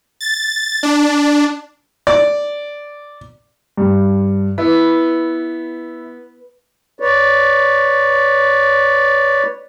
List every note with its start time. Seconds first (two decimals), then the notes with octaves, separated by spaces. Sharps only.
0.21 A6
0.83 D4
2.07 D5
3.77 G2
4.58 B3 E4
7.00 B4 C#5 D5